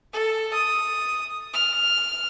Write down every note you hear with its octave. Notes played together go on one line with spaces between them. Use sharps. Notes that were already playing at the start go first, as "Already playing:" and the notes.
A4
D#6
F6